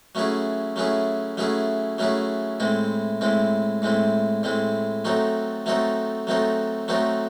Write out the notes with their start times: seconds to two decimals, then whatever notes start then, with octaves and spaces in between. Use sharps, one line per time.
0.15 F#3 A3 C#4 E4 G#4
0.76 F#3 A3 C#4 E4 G#4
1.37 F#3 A3 C#4 E4 G#4
1.98 F#3 A3 C#4 E4 G#4
2.60 A2 G#3 C4 E4
3.21 A2 G#3 C4 E4
3.82 A2 G#3 C4 E4
4.43 A2 G#3 C4 E4
5.05 F#3 A3 C4 D#4 A4
5.66 F#3 A3 C4 D#4 A4
6.27 F#3 A3 C4 D#4 A4
6.88 F#3 A3 C4 D#4 A4